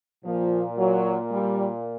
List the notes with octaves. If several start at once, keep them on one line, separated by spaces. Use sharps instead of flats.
A#2 F3
F#3
G3